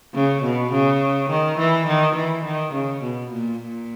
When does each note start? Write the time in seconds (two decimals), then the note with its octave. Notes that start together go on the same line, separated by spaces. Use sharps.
0.14 C#3
0.43 B2
0.72 C#3
1.30 D#3
1.58 E3
1.87 D#3
2.16 E3
2.45 D#3
2.73 C#3
3.03 B2
3.31 A#2
3.60 A#2